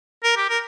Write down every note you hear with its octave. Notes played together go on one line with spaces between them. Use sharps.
A#4
G4
A#4